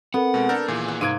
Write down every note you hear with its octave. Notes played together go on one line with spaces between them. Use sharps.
B3 C4 A4 A#4 F#5
B2 G#3
D4 A4 A#4 G6
D#2 A#2 E3 G#4
F#5
C2 G#2 A#3 F5 G#6 D7 D#7